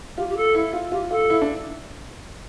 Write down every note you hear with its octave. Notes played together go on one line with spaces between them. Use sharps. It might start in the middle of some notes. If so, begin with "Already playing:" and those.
F4 G4
G4
A4
E4
F4
F4 G4
F4 A4
E4
D4